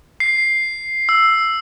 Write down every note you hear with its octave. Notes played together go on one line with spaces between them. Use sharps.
C7
E6